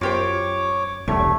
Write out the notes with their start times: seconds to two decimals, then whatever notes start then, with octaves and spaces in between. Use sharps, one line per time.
0.01 F#2 F4 G4 C5 C#5 D6
1.08 E1 C2 G3 A3 C#5